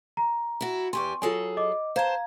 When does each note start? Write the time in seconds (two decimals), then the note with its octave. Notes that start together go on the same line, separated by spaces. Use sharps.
0.17 A#5
0.61 E4 F#4
0.93 E2 G4 G#5 C6 C#6
1.22 F#3 F4 G#4 A4 G#5
1.57 D#5 D6
1.96 C5 F5 A5 A#5 G#6